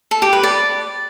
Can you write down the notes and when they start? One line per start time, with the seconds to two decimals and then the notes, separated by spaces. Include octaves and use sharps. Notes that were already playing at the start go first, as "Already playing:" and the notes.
0.11 A4
0.22 G4
0.33 B4
0.43 D5